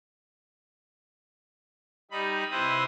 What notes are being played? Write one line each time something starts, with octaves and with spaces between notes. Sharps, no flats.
G3 D#4 B5
C3 C4 E4 B4 C5 D#6